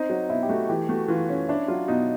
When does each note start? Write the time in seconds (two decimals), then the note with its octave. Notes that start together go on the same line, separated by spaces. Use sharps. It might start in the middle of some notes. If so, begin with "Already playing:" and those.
Already playing: C4 D#4
0.09 F#3
0.29 B2 E4
0.43 G4
0.49 A3 F#4
0.69 E3 G4
0.89 A3 F#4
1.08 E3 F4
1.29 C#4
1.48 D4 E4
1.68 F#3 F4
1.88 B2 D#4